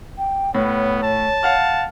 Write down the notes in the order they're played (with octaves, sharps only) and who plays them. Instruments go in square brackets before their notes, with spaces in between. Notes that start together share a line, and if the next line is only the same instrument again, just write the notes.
[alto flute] G5
[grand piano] A2 [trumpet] B3 [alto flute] C#5
[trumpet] A5
[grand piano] F5 F#5 F6